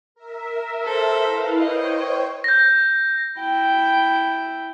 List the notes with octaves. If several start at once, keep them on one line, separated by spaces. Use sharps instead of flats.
A#4 E5
A4 C5
E4 B4 F5
C5 C#5 D#5 G5
G6 A#6
E4 G5